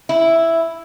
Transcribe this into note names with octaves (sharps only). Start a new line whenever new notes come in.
E4